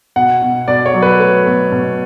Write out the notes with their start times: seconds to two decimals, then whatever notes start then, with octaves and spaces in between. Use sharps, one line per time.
0.16 B2 F#5
0.42 B2
0.68 B2 D5
0.86 C#5
0.94 F#3
1.02 B4
1.19 A3
1.46 B2
1.72 B2